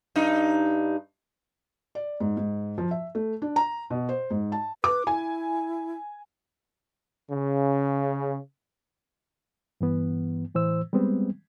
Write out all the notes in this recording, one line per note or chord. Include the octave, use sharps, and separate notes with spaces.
G2 D#4
D5
G#2
G#2
F3
E5
A3
D4
A#5
B2
C5
G#2
A5
B4 D6
E4 G#5
C#3
G2 E3 B3
A2 E3 C5 E6
G3 G#3 B3 C4